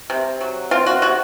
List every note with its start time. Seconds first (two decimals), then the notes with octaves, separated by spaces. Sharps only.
0.10 C3
0.41 F#3
0.71 C4 F4
0.86 F#4
1.02 C3 F#4